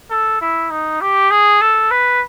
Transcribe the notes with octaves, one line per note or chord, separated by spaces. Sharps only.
A4
E4
D#4
G4
G#4
A4
B4